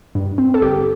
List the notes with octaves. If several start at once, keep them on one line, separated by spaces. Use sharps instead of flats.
G2
C4
A4
G1 G4